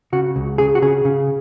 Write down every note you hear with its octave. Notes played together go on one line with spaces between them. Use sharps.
C#3 F#4
C#2
C#3 G#4
F#4
C#3 G#4
C#3